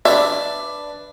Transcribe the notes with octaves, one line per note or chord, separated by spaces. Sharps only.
D4 B4 D5 E5